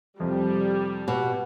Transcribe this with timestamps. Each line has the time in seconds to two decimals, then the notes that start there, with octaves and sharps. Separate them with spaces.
0.20 F2 C3 F3 G3
1.08 B2